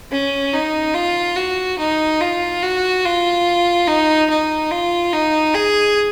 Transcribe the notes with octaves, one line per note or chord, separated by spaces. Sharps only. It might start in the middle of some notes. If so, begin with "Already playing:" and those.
C#4
D#4
F4
F#4
D#4
F4
F#4
F4
D#4
D#4
F4
D#4
G#4